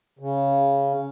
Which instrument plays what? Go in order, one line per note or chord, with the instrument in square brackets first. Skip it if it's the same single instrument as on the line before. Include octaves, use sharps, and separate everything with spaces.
[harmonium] C#3